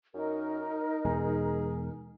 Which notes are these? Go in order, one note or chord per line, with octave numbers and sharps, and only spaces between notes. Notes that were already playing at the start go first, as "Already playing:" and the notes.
F#2 D#4 A#4
E2 B2 G#3 G#4